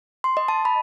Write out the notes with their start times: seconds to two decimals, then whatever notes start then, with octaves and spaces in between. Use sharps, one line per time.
0.24 C6
0.37 D#5
0.48 A5
0.65 B5